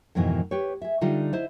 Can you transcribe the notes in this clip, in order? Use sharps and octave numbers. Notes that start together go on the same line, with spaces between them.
F2 G#2 B2 D#3 E3
G4 B4 C#5
G#4 E5
D3 G3 D4 D#4 F4
E4 C5 D#5